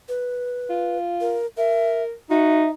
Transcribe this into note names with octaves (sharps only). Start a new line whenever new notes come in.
B4
F4
A#4
A#4 E5
D#4 F#4 E5